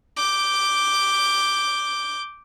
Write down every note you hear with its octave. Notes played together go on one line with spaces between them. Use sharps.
D6 G6